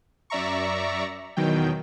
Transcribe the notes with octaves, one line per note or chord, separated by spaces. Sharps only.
F#2 D5 E5 A#5 C#6
E2 B2 D#3 F#3 G5